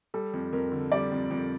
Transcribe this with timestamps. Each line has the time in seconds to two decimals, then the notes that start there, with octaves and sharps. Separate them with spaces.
0.14 G3 A4
0.33 F2
0.53 F2 A#4
0.72 D3
0.92 G3 D5
1.12 F2
1.31 F2